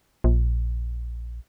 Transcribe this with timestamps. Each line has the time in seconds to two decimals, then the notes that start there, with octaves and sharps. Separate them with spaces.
0.24 A#1